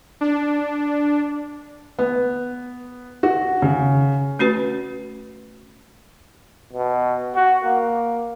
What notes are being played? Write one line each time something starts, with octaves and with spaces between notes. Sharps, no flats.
D4
B3
F#4
C#3
A3 C#4 F#4 B4
B2
F#4
A#3